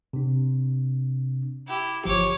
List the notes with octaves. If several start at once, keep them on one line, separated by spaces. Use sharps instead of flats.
C3 D4
E4 G4
G1 F3 G4 C#5 D6